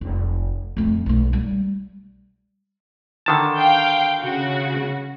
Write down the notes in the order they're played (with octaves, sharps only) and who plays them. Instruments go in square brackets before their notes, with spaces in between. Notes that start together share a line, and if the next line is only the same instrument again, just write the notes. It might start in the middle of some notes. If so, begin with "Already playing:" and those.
[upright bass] F1
F2 A3
B1 A3
G3
[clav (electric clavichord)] D3 D#3 A5
[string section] F5 G5 G6
C#3 F#4